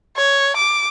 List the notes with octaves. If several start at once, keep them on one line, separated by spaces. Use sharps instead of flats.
C#5
D6